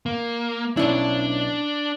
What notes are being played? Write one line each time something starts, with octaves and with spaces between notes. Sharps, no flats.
A#3
B1 C#4 D4 E4 D5